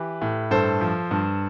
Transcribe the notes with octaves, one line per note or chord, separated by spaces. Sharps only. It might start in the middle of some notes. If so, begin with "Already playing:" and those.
Already playing: E3 G4 B4
A2
G2 A4 C5
F3
G2